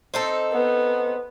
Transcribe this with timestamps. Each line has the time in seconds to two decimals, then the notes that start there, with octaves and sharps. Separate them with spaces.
0.14 C4 D#4 A4
0.52 B3